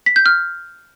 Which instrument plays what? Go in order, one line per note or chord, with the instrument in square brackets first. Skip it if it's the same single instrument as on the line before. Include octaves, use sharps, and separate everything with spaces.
[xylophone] B6
G6
F6